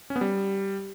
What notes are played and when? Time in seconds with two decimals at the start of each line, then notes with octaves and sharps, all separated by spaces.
0.10 C#4
0.16 B3
0.21 G3